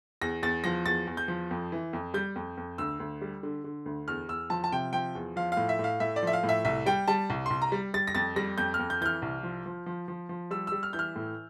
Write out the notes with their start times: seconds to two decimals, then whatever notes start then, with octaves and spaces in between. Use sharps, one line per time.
0.22 E2 A#6
0.43 E2 A6
0.64 F3 A#6
0.86 E2 A6
1.07 E2
1.17 G6
1.28 F3
1.51 F2
1.72 E3
1.93 F2
2.14 G3 G6
2.36 F2
2.57 F2
2.78 D2 E6
3.00 D2
3.21 G3
3.43 D3
3.64 D3
3.86 D2
4.08 E2 F6
4.28 E2 E6
4.50 F3 A5
4.64 A5
4.72 C3 G5
4.93 F3 G5
5.15 E2
5.36 F3 F5
5.52 F5
5.57 A2
5.69 E5
5.79 A2
5.84 F5
6.00 A2 E5
6.16 D5
6.23 F3 E5
6.33 F5
6.43 A2
6.49 E5
6.65 C2 E5
6.86 G3 G5
7.08 G3 A5
7.30 C2
7.46 C2 C6
7.62 A#5
7.72 G3
7.94 G3 A6
8.07 A#6
8.15 F2 A6
8.36 G3 A#6
8.58 F2 G6
8.74 F6
8.79 F2
8.90 G6
9.01 E3 G6
9.06 F6
9.22 C2
9.43 F3
9.66 F3
9.86 F3
10.08 F3
10.29 F3
10.51 G3 E6
10.67 G3 E6
10.83 F6
10.93 E3 G6
10.99 F6
11.16 A2